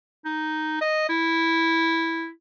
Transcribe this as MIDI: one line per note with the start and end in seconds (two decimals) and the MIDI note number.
0.25 0.79 63
0.81 1.05 75
1.09 2.29 64